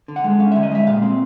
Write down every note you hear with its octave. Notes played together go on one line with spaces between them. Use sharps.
D3
F#5
G#3
C#4 F5
E5
D3
D#5
G#3 E5
A#2 F5
C4